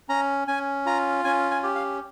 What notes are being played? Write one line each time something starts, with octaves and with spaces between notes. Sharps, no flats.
C#4 A#5
C#4 G#5
F4 A#5
C#4 G#5
G#5
G4
F5